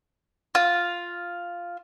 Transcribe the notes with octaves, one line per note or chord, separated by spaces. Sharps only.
F4